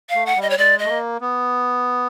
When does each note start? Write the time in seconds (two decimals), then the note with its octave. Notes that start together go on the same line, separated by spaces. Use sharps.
0.09 F5
0.15 A3
0.26 F#5
0.36 G3
0.42 D#5
0.50 C#5
0.57 G#3 D5
0.79 D#5
0.84 A3
0.89 A#3
1.21 B3